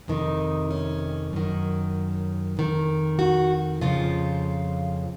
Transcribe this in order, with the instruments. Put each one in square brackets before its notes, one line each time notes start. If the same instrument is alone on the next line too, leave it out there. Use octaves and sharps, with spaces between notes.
[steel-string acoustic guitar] F2 C3 D#3 D#4
C#4
F#2 D#3
F2 D#3
F#4
F2 C#3 F3 F4